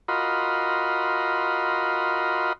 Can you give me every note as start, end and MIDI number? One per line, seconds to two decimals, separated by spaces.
0.08 2.53 65
0.08 2.53 66
0.08 2.53 70
0.08 2.53 75
0.08 2.53 83
0.08 2.53 84